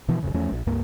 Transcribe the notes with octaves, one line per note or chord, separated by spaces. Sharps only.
B2 E3 F3
D1 G1 F2 C#3
E2 F3 A3 C#4
A#1
C#2 G2 A#3